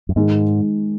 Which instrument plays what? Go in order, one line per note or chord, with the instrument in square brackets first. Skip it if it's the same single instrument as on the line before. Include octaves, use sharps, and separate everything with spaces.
[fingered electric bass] F#2
[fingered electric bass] G#2 [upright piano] D#3 G#3 D#4